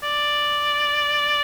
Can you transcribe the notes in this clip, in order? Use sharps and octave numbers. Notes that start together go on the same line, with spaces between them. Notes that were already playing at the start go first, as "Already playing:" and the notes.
D5